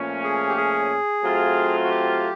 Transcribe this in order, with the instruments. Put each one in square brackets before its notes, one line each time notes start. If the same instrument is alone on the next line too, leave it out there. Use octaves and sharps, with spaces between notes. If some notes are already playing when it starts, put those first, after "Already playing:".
Already playing: [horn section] A#2 F3 A3 C#4
[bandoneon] G#4
G4
G#4
[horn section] F#3 A3 C4 F4
[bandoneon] F#4
G4